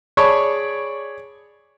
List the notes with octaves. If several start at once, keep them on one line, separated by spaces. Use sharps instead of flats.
G#4 C#5 D5 A5 B5 C#6